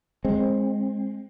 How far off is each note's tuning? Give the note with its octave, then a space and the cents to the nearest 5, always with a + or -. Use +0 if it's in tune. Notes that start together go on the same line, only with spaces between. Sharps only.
G#3 +0 C4 +25